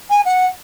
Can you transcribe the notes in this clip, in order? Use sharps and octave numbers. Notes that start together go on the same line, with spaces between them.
G#5
F#5